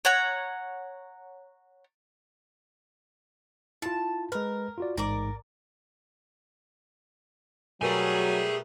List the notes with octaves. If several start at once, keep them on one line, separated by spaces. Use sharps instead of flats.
C#5 F#5 A#5
E4 F4 A5
G#3 A#4 B4
F4 F#4 D5
A1 G#2 A#4 D5 D6
B2 F#3 G3 A3 G#4 A#4 B4 G#5